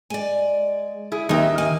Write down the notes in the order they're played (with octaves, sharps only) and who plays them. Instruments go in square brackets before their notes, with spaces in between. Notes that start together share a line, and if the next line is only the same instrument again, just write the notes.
[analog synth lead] G#3 [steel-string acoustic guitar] D5 G#5
[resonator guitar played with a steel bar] E4 G#4
[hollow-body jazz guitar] D#2 [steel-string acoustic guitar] C4 C#4 [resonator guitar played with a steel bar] D#4 E5 [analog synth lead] D#5
[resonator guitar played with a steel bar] A#3 [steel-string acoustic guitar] G#5